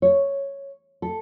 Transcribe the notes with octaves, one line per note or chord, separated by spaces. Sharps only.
C#5
A4